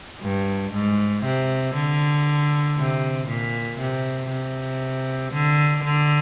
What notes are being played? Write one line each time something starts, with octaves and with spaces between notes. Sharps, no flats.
G2
G#2
C3
D3
C3
A#2
C3
C3
D3
D3